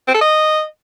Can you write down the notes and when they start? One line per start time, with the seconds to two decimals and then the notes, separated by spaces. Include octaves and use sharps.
0.08 C4
0.14 A4
0.21 D#5